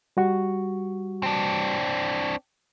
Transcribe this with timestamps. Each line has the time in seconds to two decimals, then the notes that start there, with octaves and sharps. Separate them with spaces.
0.17 G3 F#4 C#6
1.23 C4 D4